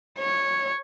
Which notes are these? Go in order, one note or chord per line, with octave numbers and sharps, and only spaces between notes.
C#5